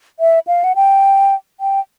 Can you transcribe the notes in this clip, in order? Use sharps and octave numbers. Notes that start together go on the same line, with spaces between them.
E5
F5
F#5
G5
G5